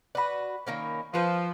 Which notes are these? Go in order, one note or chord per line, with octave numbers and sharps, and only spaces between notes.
F#4 B4 D5 B5
D#3 A#3 C#4
F3 F4 B4